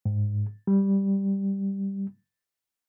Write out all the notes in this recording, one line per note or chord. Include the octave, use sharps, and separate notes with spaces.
G#2
G3